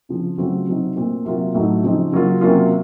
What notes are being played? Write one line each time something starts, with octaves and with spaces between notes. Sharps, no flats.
C#3 F3 C4 F4
C#3 F#3 A3 C4 F4
C3 F#3 C4 D#4
A#2 A3 C4
C3 F#3 A#3 F4
A2 F#3 A3 D#4
C#3 F3 C4 D#4
C#3 F#3 A#3 F4
C3 F#3 A#3 C#4 F4